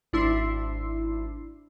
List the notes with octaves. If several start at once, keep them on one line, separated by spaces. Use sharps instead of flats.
G#1 D4 E4 C6 E6 C7